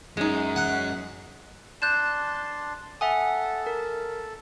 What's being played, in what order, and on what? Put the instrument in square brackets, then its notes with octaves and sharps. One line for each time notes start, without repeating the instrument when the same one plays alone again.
[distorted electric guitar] F#2 [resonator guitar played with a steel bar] G#3 D#4
[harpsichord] F#5
[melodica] D4 A5 C6 [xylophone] F#6 G6 E7
[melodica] A4 [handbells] E5 F#5 D#6 [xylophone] G#5
[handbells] A#4